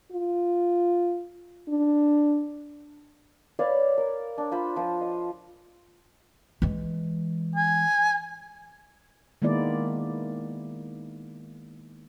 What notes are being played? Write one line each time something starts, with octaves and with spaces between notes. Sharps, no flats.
F4
D4
B4 C#5 D5 F5
A#4
D4
F4 C5 B5
F3 F4 C5
D#5
E3 G#3
G#5
D#3 G#3 A#3 B3 E4 D5